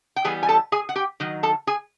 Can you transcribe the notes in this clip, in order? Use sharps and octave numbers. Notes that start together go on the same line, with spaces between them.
G5
E3 G3 B3 G#4 G#5
G#5
A4 A5
G#4 G#5
F#5
G4 G5
D#3 F#3
A4 A5
G#4 G#5